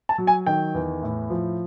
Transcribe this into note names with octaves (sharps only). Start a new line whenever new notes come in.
A5
F#3
G#5
D#3 G5
E2
A2
F3